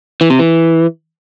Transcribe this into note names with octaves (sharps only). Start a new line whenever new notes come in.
E3
C3
E3